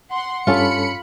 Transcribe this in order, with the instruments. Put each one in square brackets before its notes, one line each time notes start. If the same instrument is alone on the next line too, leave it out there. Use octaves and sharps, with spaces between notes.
[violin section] F#5 C6
[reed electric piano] G2 C#4 A4 [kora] F4 [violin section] B5 C#7